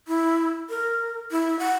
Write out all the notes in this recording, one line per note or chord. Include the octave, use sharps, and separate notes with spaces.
E4
A#4
E4
F#5